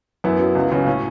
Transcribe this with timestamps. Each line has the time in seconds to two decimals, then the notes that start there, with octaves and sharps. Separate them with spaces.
0.24 F#2 B3 E4
0.40 F#3
0.55 C#2
0.72 C#3 F#3
0.86 A2 C#4